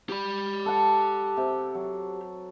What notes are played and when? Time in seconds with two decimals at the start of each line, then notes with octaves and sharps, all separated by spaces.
0.09 G4 B5
0.66 A4 F#5
1.37 C3
1.75 F#3